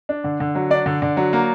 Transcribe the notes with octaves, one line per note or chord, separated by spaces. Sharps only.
D4
D3
D3
F#3
D4 D5
D3
D3
F#3
A#3